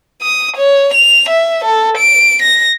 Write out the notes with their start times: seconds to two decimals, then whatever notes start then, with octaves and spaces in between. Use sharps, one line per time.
0.22 D#6
0.57 C#5
0.94 F7
1.30 E5
1.64 A4
1.97 D7
2.43 A#6